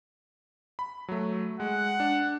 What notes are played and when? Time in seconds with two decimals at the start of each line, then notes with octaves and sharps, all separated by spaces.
0.79 B5
1.08 F#3 A3
1.60 G#3 F#5
2.00 D4